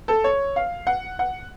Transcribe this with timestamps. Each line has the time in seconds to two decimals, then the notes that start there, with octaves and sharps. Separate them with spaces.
0.08 A4
0.24 C#5
0.56 F5
0.87 F#5
1.19 F#5